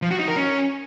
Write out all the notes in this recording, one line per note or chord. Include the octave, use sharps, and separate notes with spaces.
F3
F#4
D#4
A#4
C#4